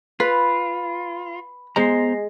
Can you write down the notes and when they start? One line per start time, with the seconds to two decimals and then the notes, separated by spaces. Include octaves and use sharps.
0.20 F4 B4 B5
1.76 G#3 B3 C5 A#5 A#6 C7